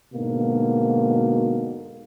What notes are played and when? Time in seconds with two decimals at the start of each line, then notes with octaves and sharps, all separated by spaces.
0.14 G#2 B2 D3 A#3 F#4